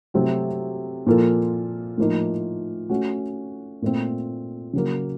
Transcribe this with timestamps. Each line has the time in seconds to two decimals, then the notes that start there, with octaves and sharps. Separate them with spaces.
0.14 C3 F#3 A3 C4 F#4
1.06 A#2 F3 A#3 F4 A4
1.98 A2 F3 A#3 D#4
2.89 A3 C#4 F#4
3.82 A#2 A3 C4
4.73 C#3 F#3 A#3